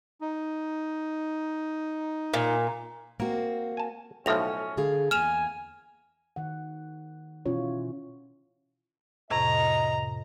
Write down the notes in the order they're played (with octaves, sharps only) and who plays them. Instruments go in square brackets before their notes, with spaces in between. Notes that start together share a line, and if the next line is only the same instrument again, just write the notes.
[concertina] D#4
[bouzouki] A#2
[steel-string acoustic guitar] A#3 C4 F#4 [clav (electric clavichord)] A#4
[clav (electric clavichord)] G#5 A5
[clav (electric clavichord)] B1 A2 F3 [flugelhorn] C#4 [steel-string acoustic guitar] A4 [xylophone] E5 A#6 F7
[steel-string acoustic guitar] D3 G#4 F5
[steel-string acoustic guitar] E2 A#3 [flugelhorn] G#5 [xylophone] F6 E7 F7
[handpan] D#3 F#5
B2 E3 C#4 E4 F4 C#5
[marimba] F2 A2 C3 [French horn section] D#5 [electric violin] A#5